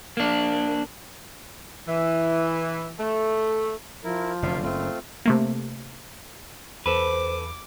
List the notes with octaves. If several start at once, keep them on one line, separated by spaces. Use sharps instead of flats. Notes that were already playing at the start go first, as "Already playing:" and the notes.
A#3 D4
E3
A3
F3 E4 A#4
F1 F#2 D3 A4 E5 F5
F#1 A3 C4 F4
C3 A3 A#3
E2 A4 B4 C5 D6